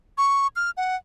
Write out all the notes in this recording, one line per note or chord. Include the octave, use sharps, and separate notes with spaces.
C#6
F6
F#5